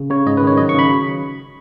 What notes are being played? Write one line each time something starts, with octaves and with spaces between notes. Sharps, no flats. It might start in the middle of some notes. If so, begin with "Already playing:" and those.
Already playing: C#3
C#3 C#5
G#2 D#5
B4
D#3 C#5
F#3 D#5
C#6
C#3 B5